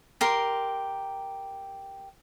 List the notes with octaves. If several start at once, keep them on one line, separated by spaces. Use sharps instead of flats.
G4 A#4 C6